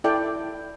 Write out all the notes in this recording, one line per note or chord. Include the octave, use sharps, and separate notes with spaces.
E4 A4 D5 G5